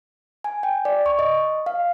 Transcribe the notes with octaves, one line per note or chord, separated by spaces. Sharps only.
G#5
G5
D5
C#6
D#5
F5